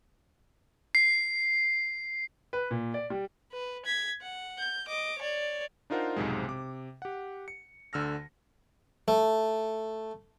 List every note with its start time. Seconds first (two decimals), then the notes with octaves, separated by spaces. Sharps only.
0.95 C7
2.53 B4
2.71 A#2
2.94 D5
3.10 G3
3.52 B4
3.85 G#6 B6
4.22 F#5
4.59 G6
4.87 D#5 D6
5.18 C#5 D5
5.90 D4 D#4 F4 A#4 C5 F#5
6.16 B1 F2 G#2 C3 G#3
6.48 C3 D6
7.02 G4 F#5
7.48 C#7
7.93 D2 D3 E6 F6 A#6
9.08 A3